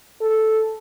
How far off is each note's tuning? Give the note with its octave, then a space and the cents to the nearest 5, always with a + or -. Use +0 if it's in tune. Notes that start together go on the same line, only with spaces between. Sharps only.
A4 -5